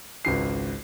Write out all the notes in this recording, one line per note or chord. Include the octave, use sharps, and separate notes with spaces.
G#1 C#2 C7